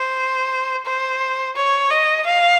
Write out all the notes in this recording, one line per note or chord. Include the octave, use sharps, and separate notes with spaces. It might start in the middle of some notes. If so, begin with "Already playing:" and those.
Already playing: C5
C5
C#5
D#5
F5